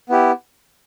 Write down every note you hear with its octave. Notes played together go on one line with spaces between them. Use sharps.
B3 E4 G4